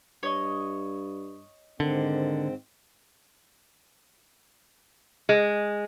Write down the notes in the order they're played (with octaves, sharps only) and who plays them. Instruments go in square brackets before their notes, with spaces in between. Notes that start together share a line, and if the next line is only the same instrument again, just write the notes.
[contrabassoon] G2 [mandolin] C#5 D#5
[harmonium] G#2 C4 [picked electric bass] D3 [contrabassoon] D#3
[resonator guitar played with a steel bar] G#3